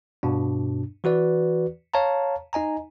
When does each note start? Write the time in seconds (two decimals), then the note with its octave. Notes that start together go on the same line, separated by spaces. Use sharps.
0.23 G2 B2 D4
1.04 E3 F#4 B4 D5
1.94 C#5 F5 A5 A#5
2.53 D#4 D#5 G#5 A#5